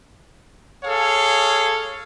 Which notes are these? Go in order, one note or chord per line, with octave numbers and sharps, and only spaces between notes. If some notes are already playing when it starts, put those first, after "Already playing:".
G#4 A4 C#5 F5